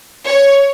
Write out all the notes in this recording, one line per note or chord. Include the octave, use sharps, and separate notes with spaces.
C#5